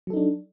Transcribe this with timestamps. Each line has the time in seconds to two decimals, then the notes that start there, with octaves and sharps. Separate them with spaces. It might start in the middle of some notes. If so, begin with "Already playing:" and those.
0.07 F#3
0.10 A4
0.13 D#4
0.17 D4